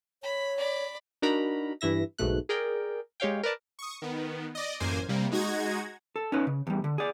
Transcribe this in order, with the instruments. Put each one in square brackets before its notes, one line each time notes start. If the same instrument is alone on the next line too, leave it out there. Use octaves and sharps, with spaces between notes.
[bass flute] C#5 [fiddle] B5
[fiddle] D5 B5
[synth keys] D4 D#4 F#4 A#4 A#5 B5
G2 E3 E4 E5 A#6
B1 G#2 B2 A3 F#6
G#4 A#4 D5 G5
G#3 G4 C#5 F5 G5
A#4 B4 D5 A5
[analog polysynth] C#6 D#6
D#3 B3
D5 D#5
A1 F#2 A#3 C5 G#5
C3 G3 A#3
G#3 D#4 F#4 G#6 A#6
[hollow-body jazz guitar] A4
C#4 D#4 B4
C#3
E2 G3
D3
G#4 D5